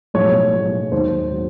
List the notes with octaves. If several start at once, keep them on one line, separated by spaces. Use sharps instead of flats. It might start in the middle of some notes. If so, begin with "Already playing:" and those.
B1 A2 F3 G#3 C#5
B1 A2 F3 G#3
D#2 D#3 F#3 C5
D#3 F#3